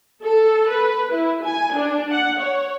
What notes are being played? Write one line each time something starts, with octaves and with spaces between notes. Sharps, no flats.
A4
B4
E4
G#5
D4
F#5
C#5